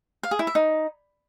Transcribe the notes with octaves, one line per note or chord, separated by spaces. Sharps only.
F5
G#4
E4
E5
D#4